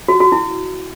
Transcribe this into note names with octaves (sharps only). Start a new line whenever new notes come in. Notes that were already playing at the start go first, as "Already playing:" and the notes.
F#4
F#4
E4